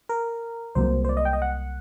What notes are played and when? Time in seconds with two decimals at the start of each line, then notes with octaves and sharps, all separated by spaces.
0.09 A#4
0.75 C2 C3 F#3 A#3 C5
1.05 C5
1.09 D5
1.17 D#5
1.25 G5
1.33 D#5
1.42 F#5